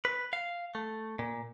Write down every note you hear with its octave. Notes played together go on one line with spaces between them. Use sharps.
B4
F5
A3
A#2